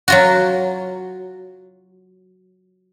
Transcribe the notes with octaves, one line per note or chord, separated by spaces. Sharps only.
F#3 F4 F#4